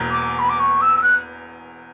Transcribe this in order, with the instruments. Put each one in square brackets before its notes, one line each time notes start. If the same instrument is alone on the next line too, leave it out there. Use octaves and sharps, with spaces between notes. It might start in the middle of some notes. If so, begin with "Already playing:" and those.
Already playing: [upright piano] E1 E2 A#3
[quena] D6
B5
D6
C#6
E6
E6
F#6